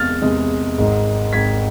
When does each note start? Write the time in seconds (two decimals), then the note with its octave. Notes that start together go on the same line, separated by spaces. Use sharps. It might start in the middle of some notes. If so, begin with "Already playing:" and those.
Already playing: E2 C3 G#3 F6 A6
0.21 E2 C3 G#3
0.78 G#1 G#2 G#3
1.33 G#1 G#2 G#3 G#6 B6